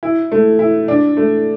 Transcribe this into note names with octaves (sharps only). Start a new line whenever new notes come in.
E4
A3
E4
D4
A3